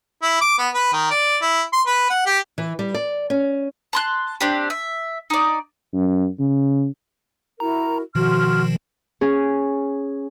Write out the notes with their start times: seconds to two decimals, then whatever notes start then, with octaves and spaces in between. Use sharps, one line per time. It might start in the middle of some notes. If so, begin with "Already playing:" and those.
0.23 E4
0.41 D6
0.59 B3
0.74 B4
0.93 D#3
1.11 D5
1.42 E4
1.73 C6
1.87 B4
2.10 F#5
2.26 G4
2.58 E3
2.79 G3
2.94 D5
3.30 C#4
3.93 A5 C6 F#6
4.41 C4 D4 G4
4.70 E5
5.30 D#4 D5
5.94 F#2
6.39 C#3
7.60 E4 F#4 A#4 A#5
8.15 B2 D#3 F3 F#4 C6 F6
9.21 C#4 G#4